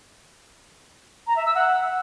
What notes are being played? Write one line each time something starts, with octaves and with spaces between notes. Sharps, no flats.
A#5
E5
E6
F#5